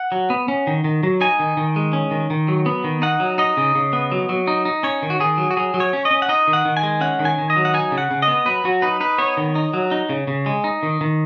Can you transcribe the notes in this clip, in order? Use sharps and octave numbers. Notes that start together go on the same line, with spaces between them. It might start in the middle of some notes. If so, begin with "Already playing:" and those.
Already playing: F#5
F#3
B3
C#4
D#3
D#3
F#3
D#4 G#5
D#3
D#3
G#3
C#4
D#3
D#3
F#3
B3
D#3
D#4 F#5
F#3
D#4 D#5
C#3
C#3
B3
F#3
F#3
D#4
D#4
C#4 C#5
D#3
F#4
D#3 G#4
F#3
F#4
F#3 G#4
F#3
C#5
C#4
D#5
C#4
F#5
D#4 D#5
D#3
F#5
D#3
G#5
G#3
C#4 F#5
D#3
G#5
D#3
D#5
F#3
F#5
D#4 G#5
C#3
F#5
C#3
D#5
B3
F#3 B4
F#3 F#4
D#4 B4
D#4 B4
B3 C#5
D#3
D#4
F#3
D#4
C#3
C#3
G#3
D#4
D#3
D#3